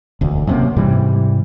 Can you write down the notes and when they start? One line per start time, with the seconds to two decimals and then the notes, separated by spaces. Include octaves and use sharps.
0.21 E1 D2
0.47 F#2 C3 A#3
0.77 G#2 C3 E3 G3